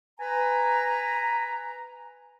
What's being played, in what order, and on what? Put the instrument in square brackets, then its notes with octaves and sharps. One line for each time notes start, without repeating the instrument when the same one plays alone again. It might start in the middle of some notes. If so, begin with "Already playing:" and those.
[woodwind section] B4 G#5 A#5